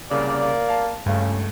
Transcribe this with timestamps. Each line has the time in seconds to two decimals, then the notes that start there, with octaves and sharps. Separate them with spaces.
0.11 C2 C#3 A#3 D5
0.69 F5 A5
1.06 C#2 G2 C#3 A3